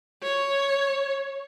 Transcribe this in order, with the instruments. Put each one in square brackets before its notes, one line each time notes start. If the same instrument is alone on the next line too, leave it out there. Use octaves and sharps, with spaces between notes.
[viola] C#5